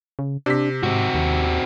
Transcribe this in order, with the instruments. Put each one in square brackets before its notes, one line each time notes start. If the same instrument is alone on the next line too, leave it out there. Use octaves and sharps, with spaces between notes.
[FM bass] C#3
[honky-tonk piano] C3 B6 [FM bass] D4
[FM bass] G#2 [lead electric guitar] C4 F#4
[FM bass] D#2